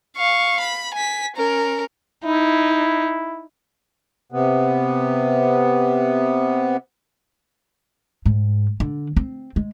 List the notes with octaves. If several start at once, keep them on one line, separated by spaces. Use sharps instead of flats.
F5 C#6
B5
G#5 B6
C#4 A#4
D#4 E4
C3 B3
G#2
D3
C4
G#3